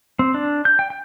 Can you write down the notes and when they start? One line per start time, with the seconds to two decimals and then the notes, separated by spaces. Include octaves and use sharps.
0.19 C4
0.34 D4
0.65 G6
0.79 G5
0.90 G5